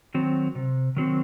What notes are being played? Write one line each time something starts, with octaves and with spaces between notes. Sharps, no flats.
D#3 F#3 C4
C3
D#3 F#3 C4